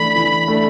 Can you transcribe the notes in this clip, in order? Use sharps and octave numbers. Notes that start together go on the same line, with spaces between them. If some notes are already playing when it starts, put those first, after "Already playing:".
Already playing: E3 A3 D4 B5
E3
A3 D4